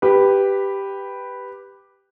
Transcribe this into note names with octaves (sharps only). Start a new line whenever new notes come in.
G4 B4